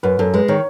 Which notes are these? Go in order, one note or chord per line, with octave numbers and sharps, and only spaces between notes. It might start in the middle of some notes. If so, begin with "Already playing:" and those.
F#2 B4
F#2 A4
G#3 B4
D#3 C#5